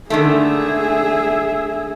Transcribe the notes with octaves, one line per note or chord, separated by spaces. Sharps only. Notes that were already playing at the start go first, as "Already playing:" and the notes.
D3 D#3 A3 G#4 E5